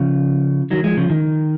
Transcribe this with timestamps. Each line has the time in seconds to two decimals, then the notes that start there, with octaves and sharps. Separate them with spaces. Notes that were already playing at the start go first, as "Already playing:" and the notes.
Already playing: C#3 F3
0.70 D#3 F#3
0.84 F3 G#3
0.97 C#3 F3
1.10 D#3